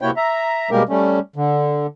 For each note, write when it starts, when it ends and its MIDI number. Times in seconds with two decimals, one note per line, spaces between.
0.01 0.11 48
0.01 0.11 58
0.01 0.11 64
0.01 0.11 66
0.01 0.11 73
0.01 0.11 79
0.17 0.70 76
0.17 0.70 82
0.71 0.83 47
0.71 0.83 55
0.71 0.83 56
0.71 0.83 58
0.71 0.83 67
0.71 0.83 70
0.89 1.19 55
0.89 1.19 57
0.89 1.19 61
1.36 1.87 50